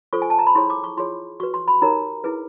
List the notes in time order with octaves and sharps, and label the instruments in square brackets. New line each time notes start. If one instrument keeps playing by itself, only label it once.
[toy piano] F4 A4 C5 C#6
G#5
A5
A#5
B5
E4 G#4 C#5 C6
D6
C#6
F4 G#4 C#5 C6
F#4 B4 C#6
C6
B5
D#4 G4 A#4 C#5 A#5
E4 G#4 B4